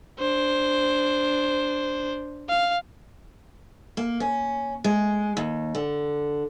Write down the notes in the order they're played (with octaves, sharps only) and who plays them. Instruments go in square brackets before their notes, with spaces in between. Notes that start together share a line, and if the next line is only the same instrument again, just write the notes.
[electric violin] D4 C5
F5
[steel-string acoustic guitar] A#3
C#4
G#3
D#2
D3